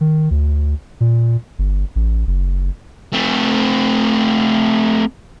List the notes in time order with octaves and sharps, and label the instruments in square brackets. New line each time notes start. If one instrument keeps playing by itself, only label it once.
[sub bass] D#3
D2
A#2
G1
A1
F#1
[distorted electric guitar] A3 C4